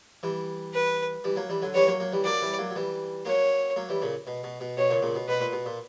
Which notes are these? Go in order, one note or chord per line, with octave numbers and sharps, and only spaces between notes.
E3 G3
B4
E3 G3
F#3 A#3
E3 G3
D3 F#3
E3 G3 C#5
F#3 A#3
F#3 A#3
E3 G3
F#3 A#3 D5
E3 G3
F#3 A#3
F#3
E3 G3
F#3 A#3 C#5
F#3 A#3
E3 G3
A#2 C#3
B2
B2
B2
B2 C#5
A#2 C#3
A#2 C#3
B2
B2 B4
A#2
B2
A#2